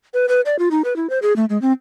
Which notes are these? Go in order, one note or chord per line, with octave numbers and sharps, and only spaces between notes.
B4
B4
D5
F4
D#4
B4
E4
C5
G#4
A3
G#3
C4